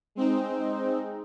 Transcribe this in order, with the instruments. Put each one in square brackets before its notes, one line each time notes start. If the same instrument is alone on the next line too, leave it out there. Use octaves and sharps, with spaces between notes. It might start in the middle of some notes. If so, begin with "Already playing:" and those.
[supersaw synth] G#3 C4 D#4